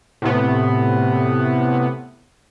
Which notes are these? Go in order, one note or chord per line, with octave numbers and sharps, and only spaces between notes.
A2 C3 B3